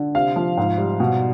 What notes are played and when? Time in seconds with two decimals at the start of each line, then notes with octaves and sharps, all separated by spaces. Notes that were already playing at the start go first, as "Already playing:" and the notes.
Already playing: D3
0.15 C3 F5
0.36 F3
0.57 G#2
0.78 G3
1.00 B2